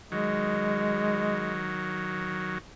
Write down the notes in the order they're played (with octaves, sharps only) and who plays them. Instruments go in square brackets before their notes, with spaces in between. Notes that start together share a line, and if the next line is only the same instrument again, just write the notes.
[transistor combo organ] D#3 F#3 [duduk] G#3